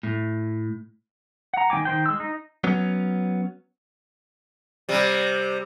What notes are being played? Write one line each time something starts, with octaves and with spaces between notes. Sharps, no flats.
A2
F#5 A#5
D#3 C#4 G5 G#5 D6
D#3 C5 G5
G#3 E6
D#4
F#3 B3 C#4
C3 G3